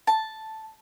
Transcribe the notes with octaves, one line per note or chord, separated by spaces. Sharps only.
A5